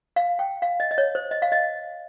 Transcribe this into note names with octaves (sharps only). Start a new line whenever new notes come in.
F5
G5
F5
D#5
D#5
C#5
C5
D#5
F5
D#5